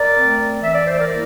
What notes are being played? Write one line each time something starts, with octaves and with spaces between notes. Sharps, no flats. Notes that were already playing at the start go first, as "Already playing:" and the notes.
Already playing: A#4 D5
A3 C4
E3 E5
D5
C5
A#4 D5
A#3 E4